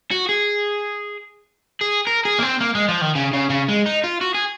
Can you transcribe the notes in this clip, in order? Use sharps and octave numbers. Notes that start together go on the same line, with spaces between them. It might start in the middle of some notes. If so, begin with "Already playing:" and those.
F#4
G#4
G#4
A#4
G#4
A#3
C4
A#3
G#3
F3
D#3
C#3
C#3
C#3
G#3
D#4
F4
F#4
G#4